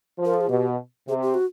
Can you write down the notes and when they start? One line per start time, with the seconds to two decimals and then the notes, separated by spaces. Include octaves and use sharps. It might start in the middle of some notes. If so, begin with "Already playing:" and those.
0.19 F3
0.25 A#4
0.34 A4
0.41 G#4
0.49 B2 G4
1.08 C3 G#4
1.23 G4
1.34 F#4